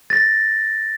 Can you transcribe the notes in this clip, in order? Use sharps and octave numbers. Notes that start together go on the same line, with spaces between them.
A6 A#6